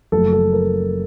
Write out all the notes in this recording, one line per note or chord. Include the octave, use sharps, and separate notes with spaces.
F#1 F#2 C#3 F3 A3 A4
A4
A#4